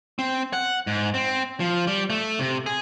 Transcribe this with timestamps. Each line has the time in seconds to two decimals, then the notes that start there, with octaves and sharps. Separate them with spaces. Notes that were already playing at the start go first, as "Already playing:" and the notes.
0.19 C4
0.53 F#5
0.87 G#2
1.14 C4
1.60 F3
1.87 G3
2.10 A3
2.39 C3
2.66 G#4